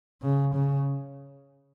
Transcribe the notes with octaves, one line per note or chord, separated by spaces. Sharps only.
C#3
C#3